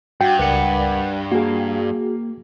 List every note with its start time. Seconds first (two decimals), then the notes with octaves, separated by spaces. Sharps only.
0.21 G2 F#4 F#5 G5
0.39 C#2 A#4 B4 D5 F#5
1.32 A#3 F#4 G#4